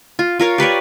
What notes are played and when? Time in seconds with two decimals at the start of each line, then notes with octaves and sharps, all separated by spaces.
0.19 F4
0.39 F4 A#4 C#5 F5
0.58 G4 B4 C#5 D5